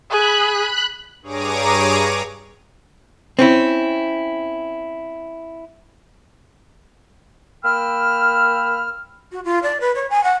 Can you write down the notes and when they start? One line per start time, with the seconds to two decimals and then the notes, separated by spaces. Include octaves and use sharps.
0.10 G#4 B5 F#6
1.22 G2 G#4 C#5 A#5 D6 D#7
3.39 C4 C#4 E4
7.64 A#3 G5 B5 E6 F6
9.32 F#4
9.45 F4
9.63 D5
9.80 B4
9.95 C#5
10.10 G#5
10.24 F#5